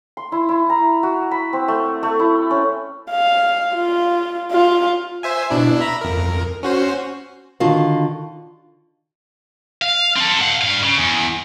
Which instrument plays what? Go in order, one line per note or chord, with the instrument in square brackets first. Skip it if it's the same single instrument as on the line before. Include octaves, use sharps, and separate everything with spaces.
[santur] C6
E4
E4
A#5
F#4
B5
C4
A3
A3
E4
C#4
[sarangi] F5
F4
F4
[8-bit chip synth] C5 E5 G#5
B2 D4 E4
E5 A#5 B5
F2 A#4
C#4 F#4 C5
[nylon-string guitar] D3 D#3 F4 F#4 F5
[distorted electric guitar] F5
C4 A4
F5 F#5
G2 F5
C#3
E2